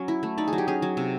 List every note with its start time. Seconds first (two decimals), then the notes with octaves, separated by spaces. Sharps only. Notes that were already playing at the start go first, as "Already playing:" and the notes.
Already playing: F#3 C#4
0.08 E4
0.23 A3
0.38 D#4 D5
0.48 G#4
0.53 F#3
0.58 G4
0.68 C#4 G#4
0.82 F#3
0.97 C3